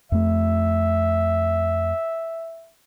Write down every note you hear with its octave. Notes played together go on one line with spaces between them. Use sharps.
F2 A3 E5